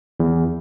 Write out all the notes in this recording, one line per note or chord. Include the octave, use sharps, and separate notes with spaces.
E2